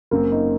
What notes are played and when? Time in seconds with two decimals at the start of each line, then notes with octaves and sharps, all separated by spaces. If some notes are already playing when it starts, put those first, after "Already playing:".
0.11 F#1 F#2 C#3 F#3 A#3 C4
0.32 D#4